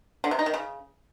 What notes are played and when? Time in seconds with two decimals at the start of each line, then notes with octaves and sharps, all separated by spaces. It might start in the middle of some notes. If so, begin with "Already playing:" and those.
0.24 D3
0.31 C3
0.39 D#4
0.46 D#3
0.54 C#3